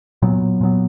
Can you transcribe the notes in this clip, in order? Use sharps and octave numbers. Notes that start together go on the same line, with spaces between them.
A#2 F#3 B3
A#2 F#3 B3